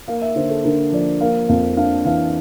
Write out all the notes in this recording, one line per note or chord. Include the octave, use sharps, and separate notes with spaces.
A#3 F5
E5
D3 C5
A4
D3 A#4
F3 D5
A#3 F5
F2 F5
D4 F5
E3 F5